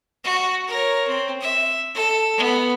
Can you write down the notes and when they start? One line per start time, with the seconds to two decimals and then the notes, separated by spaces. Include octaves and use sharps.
0.24 F#4
0.68 A#4 C#5
1.08 C4
1.41 E5
1.95 A4
2.37 B3